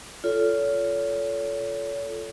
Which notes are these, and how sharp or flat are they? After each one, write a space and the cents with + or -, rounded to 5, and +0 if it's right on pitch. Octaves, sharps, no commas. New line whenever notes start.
F4 +0 A4 +0 C#5 +40